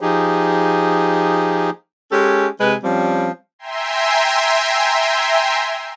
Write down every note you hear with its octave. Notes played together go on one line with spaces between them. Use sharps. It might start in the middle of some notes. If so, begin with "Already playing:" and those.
F3 D#4 G4 G#4
G#3 C#4 G4 A4
C3 G#3 B4
F3 G3 C4 C#4
E5 G5 G#5 A#5 C6